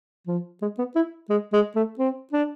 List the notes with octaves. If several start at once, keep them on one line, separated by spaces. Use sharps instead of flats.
F3
G#3
B3
E4
G#3
G#3
A3
C4
D4